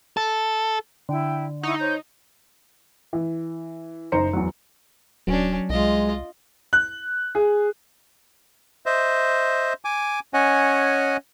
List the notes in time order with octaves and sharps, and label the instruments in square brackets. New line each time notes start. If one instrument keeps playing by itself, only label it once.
[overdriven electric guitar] A4
[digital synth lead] D3 [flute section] E4 G5
[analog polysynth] D#4 [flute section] E4 F#5 C#6
[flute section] C5 C#5 G6
[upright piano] E3
F#1 D#4 C5 A#5 C#7
E2 F#3
[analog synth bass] D#1 [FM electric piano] F#3 [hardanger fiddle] C#4 D4
[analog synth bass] C2 [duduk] G#3 [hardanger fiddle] F4 D#5
[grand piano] F#6
G#4
[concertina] C5 D#5 E5
G#5 D6
C#4 C#5 D#5 F#5 G#5